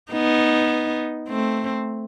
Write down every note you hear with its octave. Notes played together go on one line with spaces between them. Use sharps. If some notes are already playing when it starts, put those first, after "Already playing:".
B3 D#4
A3 C4